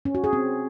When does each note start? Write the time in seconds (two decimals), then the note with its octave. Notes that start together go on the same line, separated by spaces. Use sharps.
0.05 C#4
0.15 F#4
0.24 G#4
0.33 C4